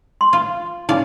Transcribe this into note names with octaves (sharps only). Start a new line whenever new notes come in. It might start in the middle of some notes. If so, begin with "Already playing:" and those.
C6
F4
C#3 D#4 D5 F5